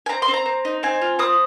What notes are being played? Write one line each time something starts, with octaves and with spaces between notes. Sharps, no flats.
G#5
C4 A#5
C6
C4
A#5
C4
D#4
C4 G#5
F4
C4 D#6